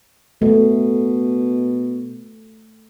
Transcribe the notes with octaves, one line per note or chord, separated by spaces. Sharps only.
B2 A3